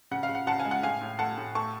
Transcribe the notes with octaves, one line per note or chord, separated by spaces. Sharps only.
C#3 F#5
F5
C#3
F#5
C#3 F#5 A5
F5 G#5
G#3
F#5
A2 F5 G#5
A2
A3 F#5 A5
A2
A3 A5 C#6